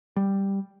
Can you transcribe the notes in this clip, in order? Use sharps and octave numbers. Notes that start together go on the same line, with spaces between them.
G3